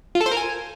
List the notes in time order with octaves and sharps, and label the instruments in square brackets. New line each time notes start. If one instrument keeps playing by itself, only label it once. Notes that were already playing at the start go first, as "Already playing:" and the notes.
[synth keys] F4
A4
C5
A#4
G#5